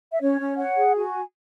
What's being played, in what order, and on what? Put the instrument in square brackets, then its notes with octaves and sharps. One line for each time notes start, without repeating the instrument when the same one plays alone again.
[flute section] E5
C#4 C#5
C#4
C#5 F#5
G#4
F#4 G#5